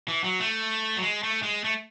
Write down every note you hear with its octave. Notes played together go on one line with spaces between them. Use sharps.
E3
F#3
A3
F#3
G#3
A3
G#3
A3